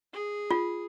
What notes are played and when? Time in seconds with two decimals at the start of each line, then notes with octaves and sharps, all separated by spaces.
0.13 G#4
0.51 F4